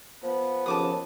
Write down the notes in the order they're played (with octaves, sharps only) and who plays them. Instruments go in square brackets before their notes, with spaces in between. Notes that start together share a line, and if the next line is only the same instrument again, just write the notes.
[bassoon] F3 [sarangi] B3
[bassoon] D#2 [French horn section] C#3 F3 [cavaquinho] A5 D6 D#6